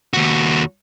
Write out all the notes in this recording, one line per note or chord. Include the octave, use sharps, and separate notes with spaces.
D#2 F#4